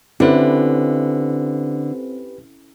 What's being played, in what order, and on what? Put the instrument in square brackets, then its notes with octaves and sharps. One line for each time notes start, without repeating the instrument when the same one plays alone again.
[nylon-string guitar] D3 [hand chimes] C4 C5 [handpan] C#4 E4 [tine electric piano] G4 B4